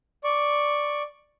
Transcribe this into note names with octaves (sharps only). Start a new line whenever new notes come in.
D5 C#6